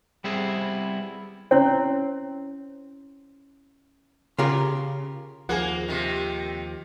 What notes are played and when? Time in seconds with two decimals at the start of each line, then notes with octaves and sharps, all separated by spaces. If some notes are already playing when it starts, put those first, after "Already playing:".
0.24 G3 B3 C4 E4 G#4
1.51 C4 C#4 E4 C#5
4.38 C#3 F4 G4 A#4
5.49 D#2 F3 A#3 G#4 F#5
5.88 C3 D#3